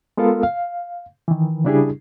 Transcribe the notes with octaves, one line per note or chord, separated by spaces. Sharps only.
G#3 B3 F4 A4 A#4 F5
F5
D#3 E3
C#3 G3 D4 E4 G4 G#4